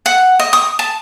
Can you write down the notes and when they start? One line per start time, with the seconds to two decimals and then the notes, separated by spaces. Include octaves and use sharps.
0.06 F#5
0.39 D#5
0.53 D#6
0.79 A5